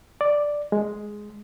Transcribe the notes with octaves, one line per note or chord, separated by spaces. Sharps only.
D5
G#3